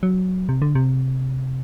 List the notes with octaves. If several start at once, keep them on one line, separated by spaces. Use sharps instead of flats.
F#3
C3
D3
C3